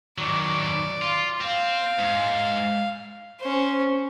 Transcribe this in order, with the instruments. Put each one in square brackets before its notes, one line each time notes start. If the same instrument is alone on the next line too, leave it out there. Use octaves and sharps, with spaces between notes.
[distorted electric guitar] D#3 F#3 [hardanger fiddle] D5
[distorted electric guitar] F4
[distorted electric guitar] C4 [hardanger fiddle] F5
[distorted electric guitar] G#2
[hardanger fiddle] C#4 C5